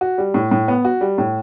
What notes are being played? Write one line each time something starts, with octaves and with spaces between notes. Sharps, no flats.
F#4
G3
A2
A2
B3
F#4
G3
A2